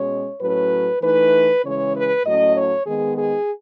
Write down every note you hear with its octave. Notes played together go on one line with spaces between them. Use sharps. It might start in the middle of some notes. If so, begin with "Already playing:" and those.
Already playing: B2 G#3 C#4 C#5
A2 F#3 C#4 B4
E3 A3 D#4 B4
C#3 E3 G#3 C#4 C#5
B4
A2 F#3 A3 C#4 D#5
C#5
D#3 G#3 B3 D#4 G#4
G#4